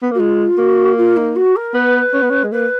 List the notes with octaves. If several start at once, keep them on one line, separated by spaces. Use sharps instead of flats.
B3
A#3 F#4
G#3 F4
A#3 F#4
F4
D#4
F#4
A#4
B3 B4
C#4
B3
C#4
G#3
A#3 B4